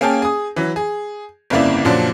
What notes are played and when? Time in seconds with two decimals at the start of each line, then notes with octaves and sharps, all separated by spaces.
0.01 A#3 C#4 G#4 F5 G5 A5
0.22 G#4 D#6
0.56 E3 F#3
0.76 G#4
1.50 G1 F2 C#3 A#3 E4 D5
1.85 F#2 A#2 C#3 F3 F#3 D4